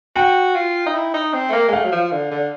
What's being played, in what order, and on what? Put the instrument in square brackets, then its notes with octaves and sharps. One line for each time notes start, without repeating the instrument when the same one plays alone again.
[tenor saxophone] F#4 [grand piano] G5
[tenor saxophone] F4
D#4
E4
D#4
C4
A3
A#3
G#3
[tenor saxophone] A3 [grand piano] F5
[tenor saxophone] F#3
F3
D3
D3